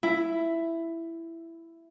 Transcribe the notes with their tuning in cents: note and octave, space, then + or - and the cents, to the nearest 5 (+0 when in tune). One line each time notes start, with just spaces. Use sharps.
E4 +10